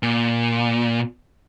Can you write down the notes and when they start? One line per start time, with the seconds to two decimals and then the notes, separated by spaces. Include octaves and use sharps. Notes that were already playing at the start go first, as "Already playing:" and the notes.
0.03 A#2